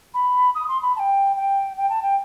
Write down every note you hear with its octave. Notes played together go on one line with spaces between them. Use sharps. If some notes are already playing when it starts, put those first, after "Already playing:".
B5
D#6
C6
B5
A5
G5
G5
G5
A5
G5